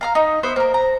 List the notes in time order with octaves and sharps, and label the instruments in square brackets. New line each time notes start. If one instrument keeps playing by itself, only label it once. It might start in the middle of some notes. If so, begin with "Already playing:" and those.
[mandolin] F5 A#5 F6
D#4
B3 C5 E5
[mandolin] A#3 A#4 [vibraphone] C5
[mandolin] A#5